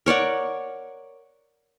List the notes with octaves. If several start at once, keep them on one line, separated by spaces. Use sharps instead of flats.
A#4 C#5 D5 F#5